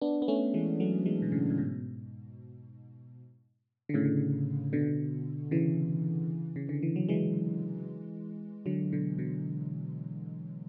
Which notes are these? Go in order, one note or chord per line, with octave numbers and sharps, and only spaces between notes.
B3 D4
B3
A3 C#4
E3 G#3
F#3 A3
E3 G#3
B2
A2 C#3
A2
G#2 B2
D3
A2 C#3
B2 D3
C#3 E3
C#3
D3
E3
F#3
E3 G#3
D3 F#3
B2 D3
B2 D3